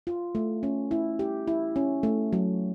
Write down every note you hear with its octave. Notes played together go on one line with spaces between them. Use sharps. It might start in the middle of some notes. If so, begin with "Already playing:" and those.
F4
A3
C#4
E4
G4
E4
C#4
A3
F#3